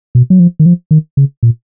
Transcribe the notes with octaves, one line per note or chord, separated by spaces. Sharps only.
B2
F#3
F3
D#3
F3
D#3
C#3
A#2